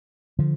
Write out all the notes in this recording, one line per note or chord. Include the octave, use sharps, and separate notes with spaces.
D3 F3